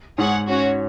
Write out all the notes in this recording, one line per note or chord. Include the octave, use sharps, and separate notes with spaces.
G#2 G#4 C#5 F#5
C#4 F#4 C#5